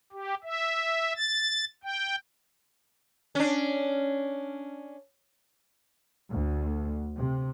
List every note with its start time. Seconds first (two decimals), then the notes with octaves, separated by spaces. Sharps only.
0.12 G4
0.44 E5
1.16 A6
1.83 G5
3.35 C#4 D4
6.31 D2
7.19 C3